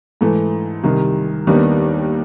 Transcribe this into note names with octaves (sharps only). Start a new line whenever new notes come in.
G#2 E3 A3
C2 C3 D#3
D#2 D#3 G3 B3 D4